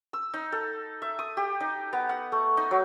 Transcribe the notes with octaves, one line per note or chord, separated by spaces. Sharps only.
E6
D#4
A4
E5
D#6
G4
D#4
B3
F#5
A3
D#4
F#3